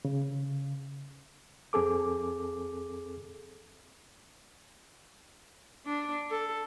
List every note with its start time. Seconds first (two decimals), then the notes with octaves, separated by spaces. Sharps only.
0.05 C#3
1.73 F2 C4 G#4 A4 D6
5.86 D4
6.30 A4